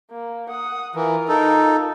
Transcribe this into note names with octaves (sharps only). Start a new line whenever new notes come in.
A#3
F#5 D#6
E3 F4 A#4
D#4 A4